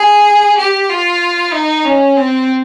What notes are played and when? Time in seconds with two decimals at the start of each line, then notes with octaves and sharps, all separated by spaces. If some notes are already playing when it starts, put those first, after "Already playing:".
Already playing: G#4
0.58 G4
0.90 F4
1.52 D#4
1.85 C#4
2.17 C4